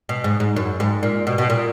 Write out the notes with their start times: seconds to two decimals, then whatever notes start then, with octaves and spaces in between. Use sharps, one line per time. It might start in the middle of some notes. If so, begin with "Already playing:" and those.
0.09 B2
0.24 G#2
0.40 G#2
0.56 F#2
0.80 G#2
1.03 A#2
1.27 B2
1.38 B2
1.50 A#2